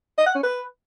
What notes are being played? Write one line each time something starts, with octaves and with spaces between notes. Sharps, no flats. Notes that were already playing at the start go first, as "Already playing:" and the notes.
D#5
F#5
C#4
B4